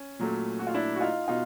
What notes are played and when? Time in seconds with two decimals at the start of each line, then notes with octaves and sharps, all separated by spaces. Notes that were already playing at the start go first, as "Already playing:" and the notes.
Already playing: C#4
0.19 A#2 F#3 A3
0.59 F#4
0.67 F4
0.74 D4 E4
0.96 F#4
1.01 D#4 F4
1.28 B2 D#4 F4